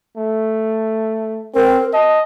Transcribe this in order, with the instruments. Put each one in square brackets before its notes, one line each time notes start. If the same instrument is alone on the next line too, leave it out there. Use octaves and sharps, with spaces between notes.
[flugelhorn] A3
[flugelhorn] C4 [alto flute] A#4
[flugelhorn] D#5 [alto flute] A5